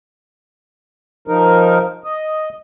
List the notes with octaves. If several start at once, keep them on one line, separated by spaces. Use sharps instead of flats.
F3 D#4 A#4
D#5